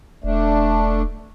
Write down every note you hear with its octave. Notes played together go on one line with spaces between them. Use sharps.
E1 A3 D4